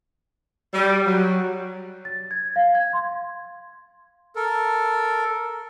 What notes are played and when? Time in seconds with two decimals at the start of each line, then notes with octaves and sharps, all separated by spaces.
0.74 G3
1.06 F#3
2.05 A6
2.31 G#6
2.56 F5
2.75 G#6
2.93 C6
4.36 A4 A#4